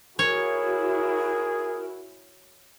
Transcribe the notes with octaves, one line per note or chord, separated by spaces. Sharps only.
E4 F#4 G#4 A#4 C#5